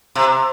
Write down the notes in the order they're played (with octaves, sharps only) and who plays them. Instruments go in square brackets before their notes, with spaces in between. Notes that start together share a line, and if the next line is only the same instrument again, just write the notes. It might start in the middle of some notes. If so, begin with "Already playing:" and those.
[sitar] C3